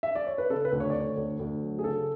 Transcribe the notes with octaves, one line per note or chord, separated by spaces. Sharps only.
E5
D5
C#5
B4
C#3 A4
B4
D2
C#5
D2 D5
C#5
D2
D2
F#3
G#4
C#3 A4